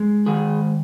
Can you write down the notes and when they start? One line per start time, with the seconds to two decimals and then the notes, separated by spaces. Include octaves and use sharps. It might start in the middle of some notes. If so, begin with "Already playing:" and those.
Already playing: G#3
0.26 D#3 G#4